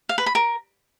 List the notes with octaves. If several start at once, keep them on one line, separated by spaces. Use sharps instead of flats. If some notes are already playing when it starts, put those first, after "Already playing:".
F5
B4
B5
A#4